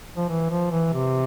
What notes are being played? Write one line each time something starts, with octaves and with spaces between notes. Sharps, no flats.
F3
E3
F3
E3
C3